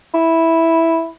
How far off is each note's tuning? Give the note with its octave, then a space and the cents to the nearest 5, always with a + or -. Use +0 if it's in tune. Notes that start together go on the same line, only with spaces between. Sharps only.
E4 -5